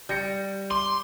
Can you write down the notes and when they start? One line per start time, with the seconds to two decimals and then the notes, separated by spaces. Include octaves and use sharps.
0.09 G3 G6 A#6 C#7
0.71 C6 D6